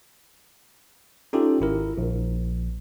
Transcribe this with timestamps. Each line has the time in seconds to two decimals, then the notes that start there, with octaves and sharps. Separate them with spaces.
1.33 C#4 D#4 F4 G4 A4
1.61 G#1 E4 A#4
1.98 A#1